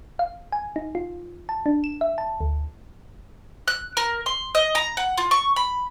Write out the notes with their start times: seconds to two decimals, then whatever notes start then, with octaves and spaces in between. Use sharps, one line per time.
0.19 F5
0.52 G#5
0.76 D#4
0.95 F4
1.49 A5
1.66 D4
1.84 E7
2.01 E5
2.18 A5
2.41 D2
3.68 F#6
3.97 A#4
4.26 C6
4.55 D#5
4.75 A#5
4.97 F#5
5.18 F4
5.31 C#6
5.56 B5